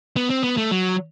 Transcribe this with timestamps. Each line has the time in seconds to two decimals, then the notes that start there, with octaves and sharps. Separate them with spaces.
0.16 B3
0.30 C4
0.44 B3
0.57 A3
0.71 F#3